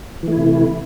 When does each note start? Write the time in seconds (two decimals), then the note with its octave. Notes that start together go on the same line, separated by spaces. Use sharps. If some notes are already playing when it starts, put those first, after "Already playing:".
0.23 E3
0.28 A3
0.33 E4
0.38 C3